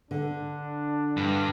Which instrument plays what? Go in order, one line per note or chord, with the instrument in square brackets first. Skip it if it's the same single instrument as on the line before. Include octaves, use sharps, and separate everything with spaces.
[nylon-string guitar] D3 [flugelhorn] D4
[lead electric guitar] G2